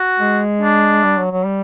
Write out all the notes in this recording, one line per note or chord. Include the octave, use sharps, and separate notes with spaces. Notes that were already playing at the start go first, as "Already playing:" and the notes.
Already playing: F#4
G#3
D4
G3
F#3
F#3
G3